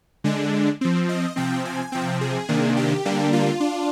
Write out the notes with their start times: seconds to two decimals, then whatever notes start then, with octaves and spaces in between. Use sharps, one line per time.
0.24 D3 G#3 D4
0.81 F3 C4
1.09 D#5
1.36 C3 F3 C4 G5
1.65 G#5
1.92 C3 F3 C4 G5
2.21 G#4
2.49 C3 D#3 A#3 D4
2.77 G4
3.05 D3 G3 A#3 D4
3.33 F4
3.60 D4